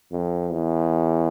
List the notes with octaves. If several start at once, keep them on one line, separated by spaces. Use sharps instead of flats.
F2
E2